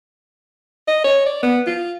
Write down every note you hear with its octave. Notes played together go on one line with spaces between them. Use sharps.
D#5
C#5
D5
B3
F4